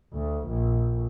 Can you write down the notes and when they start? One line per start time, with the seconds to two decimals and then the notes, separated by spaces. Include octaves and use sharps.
0.13 D2
0.47 A#1